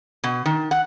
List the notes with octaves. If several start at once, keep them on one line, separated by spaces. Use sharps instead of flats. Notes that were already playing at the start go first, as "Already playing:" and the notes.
B2
D#3
F#5